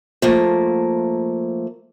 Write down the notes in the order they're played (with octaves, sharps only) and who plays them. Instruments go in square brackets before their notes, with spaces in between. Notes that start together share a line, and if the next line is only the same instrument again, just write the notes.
[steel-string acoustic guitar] F3 A3 A#3